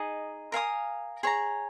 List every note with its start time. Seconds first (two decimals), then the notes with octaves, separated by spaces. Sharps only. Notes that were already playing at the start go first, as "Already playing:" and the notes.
Already playing: D#4 G#4 D#5
0.52 A#4 F5 G#5 D#6
1.23 G#4 C#5 A#5